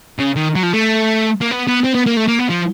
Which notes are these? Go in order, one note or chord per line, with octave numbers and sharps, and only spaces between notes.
C#3
D#3
F#3
F3
A3
A#3
B3
B3
C4
B3
A#3
A3
A#3
B3
F3